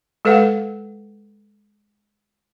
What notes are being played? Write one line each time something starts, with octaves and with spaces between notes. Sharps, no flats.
G#3 A4 B4 F5 F#5